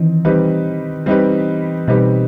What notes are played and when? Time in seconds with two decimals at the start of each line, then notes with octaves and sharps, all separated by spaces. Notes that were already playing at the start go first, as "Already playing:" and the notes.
Already playing: D#3 E3 C4 D#4
0.25 G3 C4 D#4 G4 B4
1.06 G3 C4 D#4 G4 B4
1.88 B2 G3 C4 D#4 G4 B4